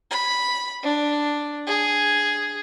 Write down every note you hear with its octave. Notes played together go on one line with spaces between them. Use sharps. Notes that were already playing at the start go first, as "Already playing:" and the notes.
B5
D4
G#4